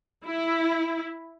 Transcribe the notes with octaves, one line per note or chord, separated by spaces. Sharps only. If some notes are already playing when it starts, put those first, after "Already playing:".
E4